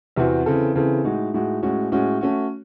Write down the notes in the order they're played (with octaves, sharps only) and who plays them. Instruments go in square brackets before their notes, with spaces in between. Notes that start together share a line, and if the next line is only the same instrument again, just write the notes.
[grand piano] E2 C3 E3 C4 F#4
C#3 E3 C4 E4 A4
C#3 E3 C4 E4 A4
A2 G#3 D#4 F#4
A2 G#3 D#4 F#4
A2 G#3 C#4 F#4
A2 G#3 C#4 F#4
A3 C#4 F#4